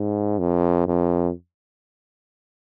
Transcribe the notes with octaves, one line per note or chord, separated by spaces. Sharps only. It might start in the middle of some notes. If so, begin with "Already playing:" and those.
Already playing: G#2
F2
F2